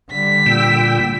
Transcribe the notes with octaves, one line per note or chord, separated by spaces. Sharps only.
D3 G3 B6
A#2 G5 E6